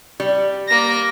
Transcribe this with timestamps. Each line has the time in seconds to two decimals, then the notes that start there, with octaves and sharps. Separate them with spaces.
0.20 G3
0.68 A#3 A#6